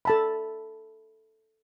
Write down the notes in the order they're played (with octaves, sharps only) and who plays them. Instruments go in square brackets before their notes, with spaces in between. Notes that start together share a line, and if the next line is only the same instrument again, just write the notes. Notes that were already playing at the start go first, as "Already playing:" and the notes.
[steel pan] A4 A5 B5